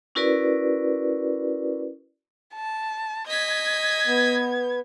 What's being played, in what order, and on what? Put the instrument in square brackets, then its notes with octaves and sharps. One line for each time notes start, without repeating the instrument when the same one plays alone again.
[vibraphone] C#4 E4 F#4 A#4 B4 D5
[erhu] A5
[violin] D#5 B6 [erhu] G#6
[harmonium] B3